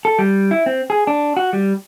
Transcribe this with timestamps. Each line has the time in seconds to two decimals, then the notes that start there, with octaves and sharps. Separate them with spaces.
0.05 A4
0.19 G3
0.51 E4
0.66 C4
0.90 G#4
1.07 D4
1.37 F#4
1.53 G3